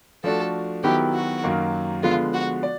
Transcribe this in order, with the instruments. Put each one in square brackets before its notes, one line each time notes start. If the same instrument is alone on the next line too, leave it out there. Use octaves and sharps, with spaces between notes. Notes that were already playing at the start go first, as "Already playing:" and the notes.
[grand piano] F3 A3 D4 F#4 [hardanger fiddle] A4
[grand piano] D#3 F#3 B3 E4 [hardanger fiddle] G4
[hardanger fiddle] F#4
[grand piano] F#2 D#3 F#3 A#3
[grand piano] D3 F3 G#3 B3 [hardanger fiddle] F4
[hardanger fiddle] F#4
[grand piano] D5